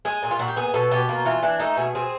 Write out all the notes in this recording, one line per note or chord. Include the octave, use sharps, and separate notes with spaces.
G#3 G#4
A#2
F4
A#2 F#4
G4
B3 G#4
B2 A4
B2 G4
A#3 F4
E3 F4
E3 D4
A3 D#4
B2 G#4
C4 G#4